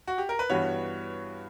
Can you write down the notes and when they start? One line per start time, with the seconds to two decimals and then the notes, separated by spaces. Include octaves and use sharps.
0.07 F#4
0.18 G4
0.29 A#4
0.39 B4
0.50 G2 E3 G3 B3 F#4 C#5